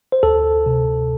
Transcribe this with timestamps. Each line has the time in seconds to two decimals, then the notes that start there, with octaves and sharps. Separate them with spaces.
0.12 C5
0.23 D2 A4
0.66 C3